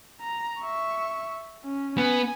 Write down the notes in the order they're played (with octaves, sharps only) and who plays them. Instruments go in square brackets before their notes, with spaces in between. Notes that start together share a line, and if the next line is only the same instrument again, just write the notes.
[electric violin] A#5
E5 C#6
C#4
[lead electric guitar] B3 [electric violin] G#5